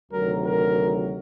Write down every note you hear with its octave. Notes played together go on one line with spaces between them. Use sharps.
D2 C3 D#3 F#3 A#4
A#4